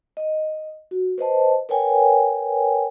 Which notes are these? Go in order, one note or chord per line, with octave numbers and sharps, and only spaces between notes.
D#5
F#4
B4 C5 D#5 A5
A#4 B4 C#5 G5 G#5